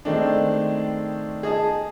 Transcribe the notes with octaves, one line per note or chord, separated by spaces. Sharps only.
D#3 G#3 A3 C4 D4
G#4 D#5 A5